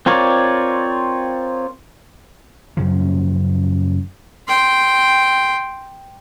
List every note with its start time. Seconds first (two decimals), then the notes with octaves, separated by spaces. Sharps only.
0.06 C4 F4 A#4 C#5 D5
2.77 F#2 C#3 F3
4.48 G5 C6